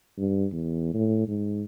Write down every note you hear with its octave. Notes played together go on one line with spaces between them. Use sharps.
G2
E2
A2
G#2